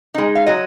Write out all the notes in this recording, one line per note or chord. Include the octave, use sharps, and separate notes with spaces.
G#3 D#4
F5
F#3 D#5